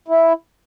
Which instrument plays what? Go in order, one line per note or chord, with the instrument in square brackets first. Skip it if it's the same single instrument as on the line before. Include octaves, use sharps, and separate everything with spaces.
[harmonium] E4